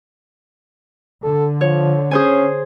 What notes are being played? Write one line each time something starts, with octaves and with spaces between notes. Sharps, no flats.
D3 A4
F3 C#5
C#4 G#4 C5 G#5